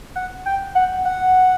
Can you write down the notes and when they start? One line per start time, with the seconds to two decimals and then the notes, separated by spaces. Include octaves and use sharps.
0.16 F#5
0.46 G5
0.75 F#5
1.05 F#5